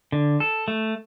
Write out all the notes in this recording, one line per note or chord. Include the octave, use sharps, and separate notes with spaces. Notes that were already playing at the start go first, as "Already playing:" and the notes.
D3
A4
A3